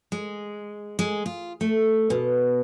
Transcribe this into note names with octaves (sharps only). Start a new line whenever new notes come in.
G#3
G#3
F4
A3
B2